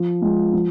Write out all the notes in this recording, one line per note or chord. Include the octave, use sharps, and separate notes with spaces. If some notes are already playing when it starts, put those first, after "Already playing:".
Already playing: F3
G#3 F4
F3